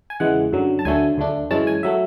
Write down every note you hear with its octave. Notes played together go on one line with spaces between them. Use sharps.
G#5
E2 C#3 E3 G#3 F#5
F#2 D3 F#3
A5
D2 D3 F#3 A3 G#5
D2 D3 A3 D4
F#2 E3 G#3 C#4 A5
G#5
F#3 A3 E5